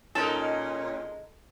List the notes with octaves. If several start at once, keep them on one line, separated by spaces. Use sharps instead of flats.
A#2 G#3 C#4 D#4 A4 A#4